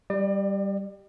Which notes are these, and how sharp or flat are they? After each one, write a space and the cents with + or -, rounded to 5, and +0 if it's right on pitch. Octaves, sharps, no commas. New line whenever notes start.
G3 +0 D5 +40